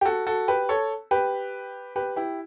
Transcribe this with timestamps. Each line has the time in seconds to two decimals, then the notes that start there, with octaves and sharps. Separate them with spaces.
0.01 G4
0.05 F#4 A4
0.26 F#4 A4
0.48 G4 B4
0.69 A4 C#5
1.11 G4 B4
1.96 G4 B4
2.16 E4 G4